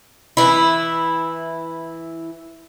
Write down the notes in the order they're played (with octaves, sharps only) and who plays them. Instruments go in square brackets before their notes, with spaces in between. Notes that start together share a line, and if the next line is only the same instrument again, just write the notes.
[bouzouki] E3 E4